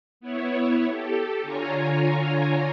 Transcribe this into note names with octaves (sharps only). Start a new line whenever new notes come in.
B3 E4 C#5
G4 A4
D3 F4 C#5 G#5 A#5